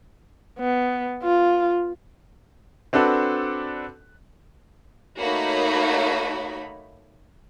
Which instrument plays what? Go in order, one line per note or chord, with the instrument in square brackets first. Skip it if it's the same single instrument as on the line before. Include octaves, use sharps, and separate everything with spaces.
[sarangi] B3
F4
[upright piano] C4 D4 F#4 A4 B4
[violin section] A3 A#3 D#4 F#4 C#5 B5